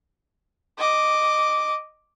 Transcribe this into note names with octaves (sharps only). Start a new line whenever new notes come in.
D#5 D6